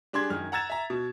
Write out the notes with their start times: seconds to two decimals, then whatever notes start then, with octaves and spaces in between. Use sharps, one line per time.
0.13 G3 D4 G#4 C6 G#6
0.30 F#2 D#3 F6
0.52 F#5 A#5 E6 G#6 A6 E7
0.70 E5 A#5
0.90 B2